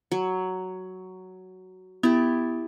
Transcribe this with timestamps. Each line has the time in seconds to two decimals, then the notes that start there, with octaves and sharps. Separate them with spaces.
0.12 F#3
2.03 B3 E4 G4